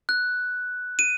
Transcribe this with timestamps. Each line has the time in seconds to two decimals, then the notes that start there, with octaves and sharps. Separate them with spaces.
0.09 F#6
0.99 D#7